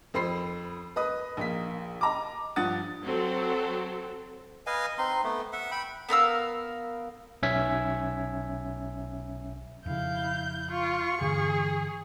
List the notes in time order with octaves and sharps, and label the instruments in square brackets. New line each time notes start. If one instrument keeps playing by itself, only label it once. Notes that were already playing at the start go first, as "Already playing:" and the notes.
[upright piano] F2 C5 B5 C7
B4 D#5 D#6
A#1 A#3 B6
D#5 A#5 D6
G2 F3 F#5 D#6 A6
[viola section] F#3 C4 A4
[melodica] B4 D#5 F5 G#5
C4 D#4 C6
A3 B3
E5 F#5
G5 B5
[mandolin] B3 A#4 F5 E6
[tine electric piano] B1 C#4 E5 G#6 B6
[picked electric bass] F2 C#3 [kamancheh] E4 F5 [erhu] G6
[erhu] F4 [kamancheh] C#6
[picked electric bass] G2 D3 E3 [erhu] G#4